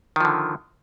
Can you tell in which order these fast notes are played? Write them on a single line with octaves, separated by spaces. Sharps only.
D#3 F3 D3